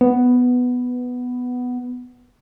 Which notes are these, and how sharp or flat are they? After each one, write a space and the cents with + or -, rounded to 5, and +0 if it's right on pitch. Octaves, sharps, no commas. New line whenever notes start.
B3 +5